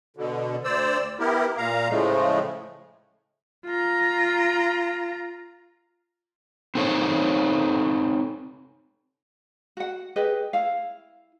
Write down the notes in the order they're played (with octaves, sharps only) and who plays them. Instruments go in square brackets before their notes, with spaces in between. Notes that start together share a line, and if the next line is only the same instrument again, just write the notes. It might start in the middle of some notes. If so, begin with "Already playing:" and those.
[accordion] B2 D3
D2 C5 D5 E6
B3 E4 G4 A#4
A#2 F5 A#5
A2 C#3 F3 G#3 A3
[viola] F4 A#5
[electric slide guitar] C4 D#4 A4 C5 C#5
[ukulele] F#4 F#5
G4 G#4 B4 D#5
E4 F5